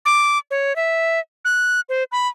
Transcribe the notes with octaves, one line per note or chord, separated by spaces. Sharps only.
D6
C#5
E5
F#6
C5
B5